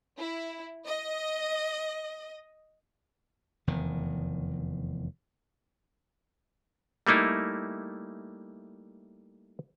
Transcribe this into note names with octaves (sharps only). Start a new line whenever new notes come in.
E4
D#5
F1 E2 D#3
G3 A3 A#3 D#4 E4